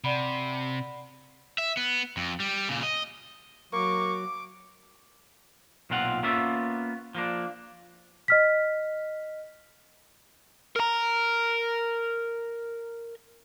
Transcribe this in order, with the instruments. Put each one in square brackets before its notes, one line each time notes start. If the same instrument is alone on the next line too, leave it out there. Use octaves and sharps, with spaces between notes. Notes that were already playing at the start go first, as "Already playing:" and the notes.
[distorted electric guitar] C3 [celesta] D5 F#5 B5
[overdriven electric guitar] E5
B3
F2
G3
A#2 C#3
D#5
[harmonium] F#3 [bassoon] A#3 [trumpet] C#6 [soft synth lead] D6
[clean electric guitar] B1 A#2 C4 F4 F#5
A#3 B3 C#4 F4 E5
F3 A#3 D4
[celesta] D#5 F6 B6
[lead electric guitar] A#4 A#5